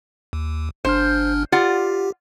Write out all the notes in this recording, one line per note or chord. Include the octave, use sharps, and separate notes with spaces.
D#2
G1 D4 C5 F6
F4 G4 D5 F#5